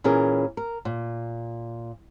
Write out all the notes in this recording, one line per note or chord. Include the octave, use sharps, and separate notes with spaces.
A#2 E3 C#4 G#4 A#4
A#4
A#2